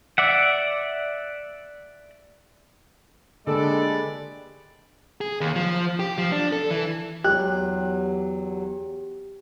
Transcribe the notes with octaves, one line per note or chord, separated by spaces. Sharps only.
D5 E5 F#5
D3 G#3 A#3 G4 A4 B4 D5
G#4
D#2
F3
G4
F3
D4
A4
E3
E2 F#3 G4 F#6